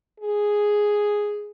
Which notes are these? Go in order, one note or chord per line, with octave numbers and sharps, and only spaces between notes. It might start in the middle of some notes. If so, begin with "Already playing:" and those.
G#4